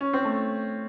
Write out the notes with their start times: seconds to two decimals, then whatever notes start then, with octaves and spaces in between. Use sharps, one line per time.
0.01 C#4
0.13 C4
0.25 A3